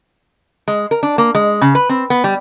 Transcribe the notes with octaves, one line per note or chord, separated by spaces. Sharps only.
G#3
A#4
D4
A#3
G#3
C#3
B4
C4
B3
G3